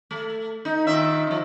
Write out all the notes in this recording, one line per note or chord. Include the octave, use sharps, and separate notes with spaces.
A3
D#4
A#2 D#3 E5
D3 F3